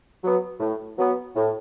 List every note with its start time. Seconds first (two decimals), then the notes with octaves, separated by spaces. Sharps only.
0.23 F#3 B3
0.60 A2
0.98 F#3 B3
1.35 A2